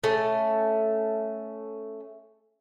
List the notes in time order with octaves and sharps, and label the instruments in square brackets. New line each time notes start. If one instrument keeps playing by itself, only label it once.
[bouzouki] A3 C#4